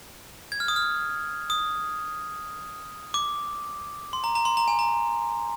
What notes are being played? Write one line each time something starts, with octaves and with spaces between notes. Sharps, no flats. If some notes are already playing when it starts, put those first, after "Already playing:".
G#6
F6
D#6
F6
D#6
D6
C6
A#5
A#5
C6
A#5
G#5
A#5